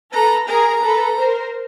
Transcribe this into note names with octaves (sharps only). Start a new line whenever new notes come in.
A4 B4 A#5
G#4 A#4 A#5
A4 B4
A#4 C5